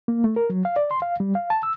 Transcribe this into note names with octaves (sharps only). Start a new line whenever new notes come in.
A#3
A3
A#4
F#3
F5
D5
C6
F5
G3
F5
A5
E6